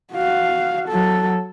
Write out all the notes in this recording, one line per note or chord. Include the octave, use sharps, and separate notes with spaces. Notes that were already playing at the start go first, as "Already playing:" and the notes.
F#4 F5
F#3 A4